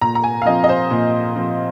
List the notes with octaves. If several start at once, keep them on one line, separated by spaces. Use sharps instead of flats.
A#2 A#5
A#5
G#5
F5
F3 C4 D#5
D#5
C5
A#2
F3 C4